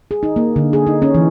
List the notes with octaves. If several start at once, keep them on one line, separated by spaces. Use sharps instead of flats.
G#4
D#4
A#3
D3
G#4
D#4
C#4
E3